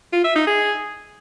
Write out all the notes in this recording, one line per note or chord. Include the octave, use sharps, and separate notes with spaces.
F4
E5
D#4
G#4